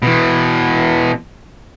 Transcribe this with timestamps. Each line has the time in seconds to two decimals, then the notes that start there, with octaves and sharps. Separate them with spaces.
0.03 B2 E3